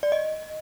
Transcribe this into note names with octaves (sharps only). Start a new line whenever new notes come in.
D5
D#5